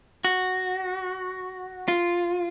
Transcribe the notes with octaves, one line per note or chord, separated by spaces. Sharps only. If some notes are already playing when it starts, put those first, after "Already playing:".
F#4
F4